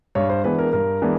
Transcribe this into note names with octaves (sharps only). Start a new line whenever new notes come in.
G2 C#5
C5
E3 G#3 B3 D4 B4
A#4
G2 A#4
E3 G#3 B3 D4